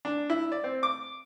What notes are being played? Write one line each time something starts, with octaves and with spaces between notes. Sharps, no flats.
D4
E4
D5
C4
D6